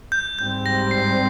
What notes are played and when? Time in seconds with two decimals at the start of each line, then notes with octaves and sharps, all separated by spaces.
0.12 G6
0.39 G#2 G3 C4 G6
0.66 A#6
0.91 C7